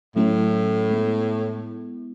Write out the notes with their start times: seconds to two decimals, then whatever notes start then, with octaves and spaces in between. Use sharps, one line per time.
0.16 A2 F#3 A3 C#4 E4 A4
0.91 G#3 B3 E4